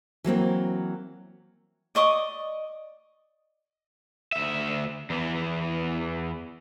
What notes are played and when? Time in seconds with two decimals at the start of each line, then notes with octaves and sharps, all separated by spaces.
0.24 E3 F#3 A#3 C4
1.95 D5 D#5 C#6 D#6
4.32 D2 E5
5.10 E2 E3